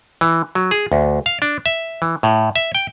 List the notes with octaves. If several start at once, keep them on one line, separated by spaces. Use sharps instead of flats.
E3
F#3
G#4
D2
F5
D4
E5
E3
A2
E5
G5